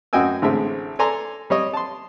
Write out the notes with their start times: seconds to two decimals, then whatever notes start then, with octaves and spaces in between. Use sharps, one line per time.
0.13 F#2 F#4 D#5 G5 G#5 E6
0.42 A1 D3 G#3 C4 E5
0.99 A4 D5 G#5 A#5 C6
1.50 G3 C#5 D#5
1.73 A5 C6